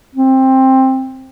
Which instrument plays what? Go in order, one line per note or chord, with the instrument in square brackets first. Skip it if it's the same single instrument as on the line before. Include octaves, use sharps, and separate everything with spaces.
[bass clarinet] C4